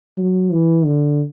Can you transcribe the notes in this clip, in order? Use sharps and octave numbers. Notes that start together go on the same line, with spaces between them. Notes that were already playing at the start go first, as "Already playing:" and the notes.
F#3
E3
D3